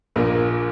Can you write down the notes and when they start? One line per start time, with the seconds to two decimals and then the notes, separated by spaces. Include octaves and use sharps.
0.16 A#1 A#2 A#3